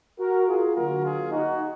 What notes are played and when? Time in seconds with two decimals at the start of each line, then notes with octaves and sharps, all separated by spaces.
0.19 F#4 A#4
0.47 F4 G#4
0.76 D3 F#3 A#3 F#4 A#4
1.04 F4 G#4
1.32 D#4 F#4